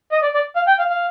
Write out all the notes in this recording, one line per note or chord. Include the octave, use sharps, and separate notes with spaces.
D#5
D5
D5
F5
G5
F5
F5